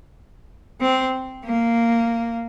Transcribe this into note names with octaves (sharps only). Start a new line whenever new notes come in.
C4
A#3